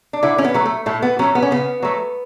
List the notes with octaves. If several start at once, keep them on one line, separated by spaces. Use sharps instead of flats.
D4
D3 E4
C#4
B3
F#3 A3
A3
A2 A3
B3
F#3 A3 C#4
B3
C#4
C#3 B3
F#3 A3